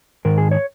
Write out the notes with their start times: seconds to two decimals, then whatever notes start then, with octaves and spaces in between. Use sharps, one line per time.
0.25 G#2 D#3 A#4
0.38 G#4
0.51 C#5